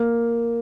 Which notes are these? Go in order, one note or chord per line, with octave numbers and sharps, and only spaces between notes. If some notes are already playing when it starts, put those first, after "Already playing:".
Already playing: A#3